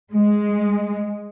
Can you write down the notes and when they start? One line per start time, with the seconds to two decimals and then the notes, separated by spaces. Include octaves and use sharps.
0.12 G#3